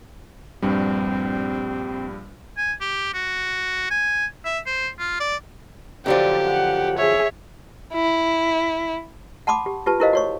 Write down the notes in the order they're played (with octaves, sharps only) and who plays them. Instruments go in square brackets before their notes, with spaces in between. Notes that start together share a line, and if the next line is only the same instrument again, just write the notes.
[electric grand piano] A#1 G2 G3 [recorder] C4
[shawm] G#5
G4
F#4
G#5
E5
C5
F4
D5
[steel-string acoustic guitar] F#2 D3 F3 [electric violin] G4 [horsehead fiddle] D5
[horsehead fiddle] F#5
[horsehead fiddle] G#4 E5 [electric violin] C#5
[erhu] E4
[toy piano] F#5 A5 B5 C6 D6 D#6
G4
F4 G4 B4 A5
E4 G4 A#4 C5 D#5 F5
F#4 C#5 C#6